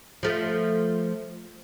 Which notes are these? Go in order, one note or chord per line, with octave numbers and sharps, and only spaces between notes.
F3 A3